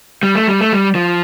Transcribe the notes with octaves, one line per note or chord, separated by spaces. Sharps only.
G3
A3
G3
A3
G3
F3